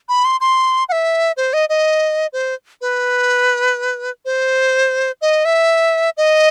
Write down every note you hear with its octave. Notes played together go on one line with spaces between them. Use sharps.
B5
C6
C6
F#5
E5
C5
D#5
D#5
C5
B4
C5
D#5
E5
D#5